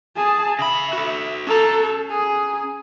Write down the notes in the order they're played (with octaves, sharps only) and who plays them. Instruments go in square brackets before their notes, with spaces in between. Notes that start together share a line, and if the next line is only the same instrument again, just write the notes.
[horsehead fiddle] G#4 A5
[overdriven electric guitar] C#3 B5 [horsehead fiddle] E5
[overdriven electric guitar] F#4 A4
[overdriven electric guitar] C#4 A#5 [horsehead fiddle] A4
[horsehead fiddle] G#4